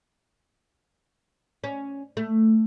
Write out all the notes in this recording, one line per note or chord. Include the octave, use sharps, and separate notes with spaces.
C#4
A3